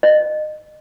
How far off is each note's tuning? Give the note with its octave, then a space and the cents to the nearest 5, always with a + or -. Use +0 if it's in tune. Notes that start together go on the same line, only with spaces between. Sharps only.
D#5 -30